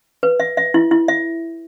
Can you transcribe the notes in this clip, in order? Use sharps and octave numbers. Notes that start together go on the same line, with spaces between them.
B4
E5
E5
E4
E4
E5